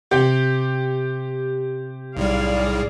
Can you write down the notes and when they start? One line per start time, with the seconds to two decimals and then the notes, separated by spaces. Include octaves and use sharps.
0.11 C3 G4
2.17 B1 A2 G3 G#4 D5 F5